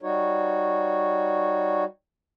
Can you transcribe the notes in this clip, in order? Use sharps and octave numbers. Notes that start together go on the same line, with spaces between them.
G3 D#4 F#4 C#5